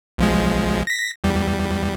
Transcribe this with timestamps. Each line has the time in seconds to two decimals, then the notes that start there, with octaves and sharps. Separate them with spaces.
0.18 B1 F3 G#3
0.87 A#6 B6
1.24 E2 G3